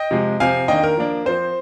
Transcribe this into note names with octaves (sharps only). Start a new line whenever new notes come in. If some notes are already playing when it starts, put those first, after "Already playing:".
Already playing: D#5 G5
C3 F3 G#3
C3 F3 C4 F5 G#5
D#3 A#3 D4 D#5 G5
A#4
F3 A#3 D4
F3 C4 C5